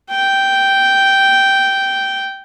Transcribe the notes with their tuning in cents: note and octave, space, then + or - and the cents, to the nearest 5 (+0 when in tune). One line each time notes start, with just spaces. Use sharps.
G5 -5